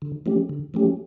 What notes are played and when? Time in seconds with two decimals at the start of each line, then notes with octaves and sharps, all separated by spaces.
0.02 D3
0.26 F3 A3 C#4 G4
0.49 D3
0.74 F3 A3 C#4 G4